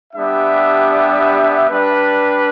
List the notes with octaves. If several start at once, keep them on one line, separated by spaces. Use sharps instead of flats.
G3 B3 D4 G4 E5
G3 D4 B4